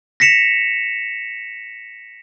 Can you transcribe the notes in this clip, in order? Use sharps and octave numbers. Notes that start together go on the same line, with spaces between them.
A#6 B6 C#7 E7 F7